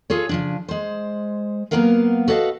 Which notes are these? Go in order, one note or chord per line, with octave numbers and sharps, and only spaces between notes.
F4 G#4 A4 C#5
C#3 F3 D4
G#3 C5
F#3 G#3 A#3 B3 A#4 F5
F#4 A4 B4 D5 D#5 F5